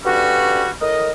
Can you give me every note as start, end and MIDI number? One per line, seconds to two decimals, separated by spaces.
0.04 0.69 38
0.04 0.69 43
0.04 0.69 55
0.04 0.69 61
0.04 0.69 66
0.81 1.10 45
0.81 1.10 70
0.81 1.10 75